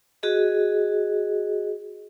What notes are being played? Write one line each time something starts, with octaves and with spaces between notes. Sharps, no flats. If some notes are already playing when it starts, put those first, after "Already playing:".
F#4 G#4 D#5